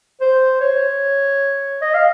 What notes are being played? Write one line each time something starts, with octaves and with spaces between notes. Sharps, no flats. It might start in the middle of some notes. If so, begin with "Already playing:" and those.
C5
C#5
D#5
F5